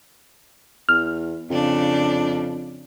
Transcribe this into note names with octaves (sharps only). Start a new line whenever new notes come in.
E2 F6
F2 C#3 D4